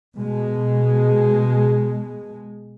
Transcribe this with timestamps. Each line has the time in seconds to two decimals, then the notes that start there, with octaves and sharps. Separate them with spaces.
0.17 B2 G#3